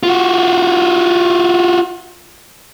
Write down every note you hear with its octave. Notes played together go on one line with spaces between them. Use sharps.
F4 F#4